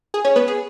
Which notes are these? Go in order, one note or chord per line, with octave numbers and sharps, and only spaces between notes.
G#4
C#4 C#5
B3 B4
G#4